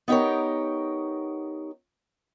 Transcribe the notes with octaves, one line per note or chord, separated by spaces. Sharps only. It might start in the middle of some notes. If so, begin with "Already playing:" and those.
B3 D#4 G4 A#4 C#5